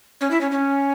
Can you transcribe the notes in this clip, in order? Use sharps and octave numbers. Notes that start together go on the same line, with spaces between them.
C#4
E4
C#4
C#4